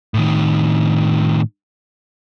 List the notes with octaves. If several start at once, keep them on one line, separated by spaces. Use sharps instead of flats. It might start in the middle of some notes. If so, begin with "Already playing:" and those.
A2 D#3